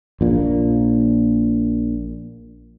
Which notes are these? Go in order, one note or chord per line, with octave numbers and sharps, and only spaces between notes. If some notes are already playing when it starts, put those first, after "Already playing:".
A#1 A#2